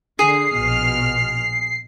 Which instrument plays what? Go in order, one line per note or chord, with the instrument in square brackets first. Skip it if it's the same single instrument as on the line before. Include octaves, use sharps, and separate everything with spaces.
[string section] D3 [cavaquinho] G#4 [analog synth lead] C7
[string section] A#1 B2 F6